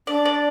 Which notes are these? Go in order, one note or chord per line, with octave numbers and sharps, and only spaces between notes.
D4 D5
D5